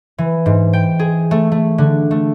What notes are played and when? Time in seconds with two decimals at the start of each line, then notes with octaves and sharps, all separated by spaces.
0.18 E3
0.46 G#2
0.73 G5
0.99 G#4
1.31 A3
1.52 A3
1.78 D3
2.11 A3